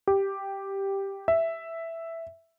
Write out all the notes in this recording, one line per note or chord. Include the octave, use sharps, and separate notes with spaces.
G4
E5